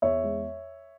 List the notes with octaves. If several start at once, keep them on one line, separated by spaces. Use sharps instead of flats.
E2 C#5 E5
G#3